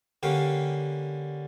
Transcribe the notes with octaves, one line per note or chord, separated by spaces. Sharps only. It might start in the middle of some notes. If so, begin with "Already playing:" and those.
D3 G3 A#3 C#4 F5 G5